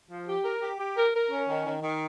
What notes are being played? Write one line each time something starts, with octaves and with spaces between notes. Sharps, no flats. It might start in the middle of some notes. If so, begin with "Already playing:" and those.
F3
G4
A#4
G4
G4
A#4
A#4
C#4
D#3
D#3
D#3